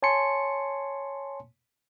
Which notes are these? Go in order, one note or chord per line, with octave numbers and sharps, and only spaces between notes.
C#5 G#5 A5 C6 C#7